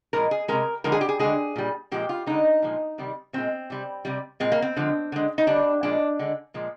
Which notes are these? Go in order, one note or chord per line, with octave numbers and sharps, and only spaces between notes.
A#2 F3 G#3 A#4
G#4
C3 D#3 G#3 A#4
D3 F3 G#3 A#4
G#4
G4
G#4
D3 G#3 G#4
A#2 G3
A#2 F3 G#3 G4
F4
D3 G#3 D#4
A#2 F3 G#3
C3 D#3 G3
A#2 G#3 C4
C3 G3
C3 G3
A#2 G#3 C4
A#3
C4
D3 F3 G#3
D3 G#3
D#4
D3 G3 D4
A#2 F3 G#3 D4
D3 G#3
A#2 F3 G#3